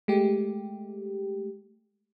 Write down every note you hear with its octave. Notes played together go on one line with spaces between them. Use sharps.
G#3 A3 G4